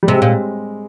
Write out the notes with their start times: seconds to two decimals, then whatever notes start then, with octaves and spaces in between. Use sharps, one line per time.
0.03 G3
0.07 C3 G#3
0.22 A#2